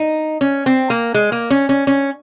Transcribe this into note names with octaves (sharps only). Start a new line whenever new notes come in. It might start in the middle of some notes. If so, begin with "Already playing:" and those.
Already playing: D#4
C#4
C4
A#3
G#3
A#3
C#4
C#4
C#4